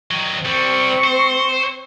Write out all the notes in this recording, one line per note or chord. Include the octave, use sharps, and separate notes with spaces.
D#3 F#3
C2 G3 C4 C#6
C5